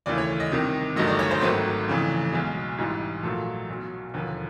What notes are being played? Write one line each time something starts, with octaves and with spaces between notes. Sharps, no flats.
D#2 C#3 E3 A3 D5
C#5
D#5
C2 C3 D#3
G1 G2 D#3 F#3 A3 D#5
D5
C#5
C5
G#1 G#2 D#3 F#3 A3 B4
F1 F2 C#3 E3 A3
B1 B2 G#3
A1 G#2 E3 G3
A#1 A#2 F#3 A3 A4
B1 B2 F#3
E1 D#2 D3 F3 B4